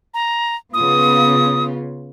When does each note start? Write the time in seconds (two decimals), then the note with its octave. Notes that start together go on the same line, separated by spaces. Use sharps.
0.14 A#5
0.74 C#3 B3 F4 D#6